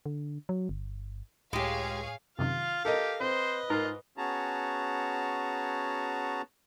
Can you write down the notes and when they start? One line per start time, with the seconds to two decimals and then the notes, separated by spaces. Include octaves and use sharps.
0.06 D3
0.49 F#3
0.69 G1
1.53 C#2 A2 G#3 G4 G#4 C#5 F5
2.39 F#2 C3 D#3 F4 F5
2.85 G4 A4 A#4 D#5
3.20 C4 B4 C5 D#5
3.70 G#2 F4 A#4
4.18 B3 C#4 F#4 G#4 A5 A#5